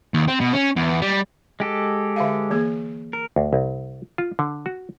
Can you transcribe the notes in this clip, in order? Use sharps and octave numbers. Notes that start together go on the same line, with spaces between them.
D#2
C4
B2
C#4
E2
G3
G#3 G4 A4
D3 E5 F5
E3 A#3 G#4
A#4
D2
C2
F4
D3
F#4